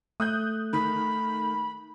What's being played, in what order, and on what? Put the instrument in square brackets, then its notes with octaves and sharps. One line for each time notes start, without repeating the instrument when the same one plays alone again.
[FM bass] A3 [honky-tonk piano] D#6 F#6 G6
[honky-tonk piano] D#3 [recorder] B5